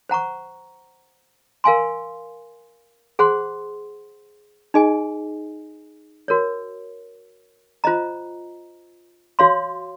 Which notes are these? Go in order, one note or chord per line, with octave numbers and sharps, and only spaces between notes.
C5 F#5 A#5 C#6
A#4 F5 G#5 C6
G#4 C5 F#5 C6
D#4 G#4 D#5 G#5
F#4 A#4 C#5
F4 C5 D#5 A#5
F#4 C#5 F5 C6